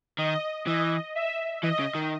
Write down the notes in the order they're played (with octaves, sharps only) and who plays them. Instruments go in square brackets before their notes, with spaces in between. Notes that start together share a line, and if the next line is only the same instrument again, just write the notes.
[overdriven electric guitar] D#3 [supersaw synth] D#5
[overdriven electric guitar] E3 [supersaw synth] D#5
[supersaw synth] E5
[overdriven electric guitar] E3 [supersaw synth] D#5
[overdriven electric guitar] C#3
D#3